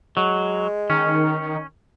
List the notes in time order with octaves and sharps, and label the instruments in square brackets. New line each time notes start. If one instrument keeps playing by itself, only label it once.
[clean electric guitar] F#3 [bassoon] G#3
[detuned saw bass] D#3 [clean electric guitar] C#4